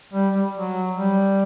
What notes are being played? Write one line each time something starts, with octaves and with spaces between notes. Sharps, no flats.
G3
G3
F#3
G3